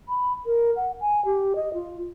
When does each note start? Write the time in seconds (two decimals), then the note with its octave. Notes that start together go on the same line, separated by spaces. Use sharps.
0.09 B5
0.46 A#4
0.76 F#5
1.01 G#5
1.25 G4
1.56 D#5
1.74 F4